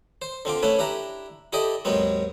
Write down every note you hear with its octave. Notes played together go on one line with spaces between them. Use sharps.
C5
D3 C4 F4 D6
A3 C#4 E4 B4
D4 E4 G4 A#5
E4 G4 A4 D5 D#5
D#2 G#2 F#3 B3 C4